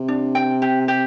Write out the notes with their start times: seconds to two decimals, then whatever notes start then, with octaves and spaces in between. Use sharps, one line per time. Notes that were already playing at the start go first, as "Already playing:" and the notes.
Already playing: C3
0.08 D4
0.35 G5
0.62 G4
0.88 G4